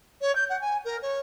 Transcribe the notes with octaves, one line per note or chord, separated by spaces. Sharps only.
C#5
G6
F#5
G#5
A#4
C#5